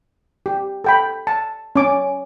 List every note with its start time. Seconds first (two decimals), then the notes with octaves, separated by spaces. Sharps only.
0.46 G4
0.84 A4 G5 B5
1.27 A5
1.76 C#4 D6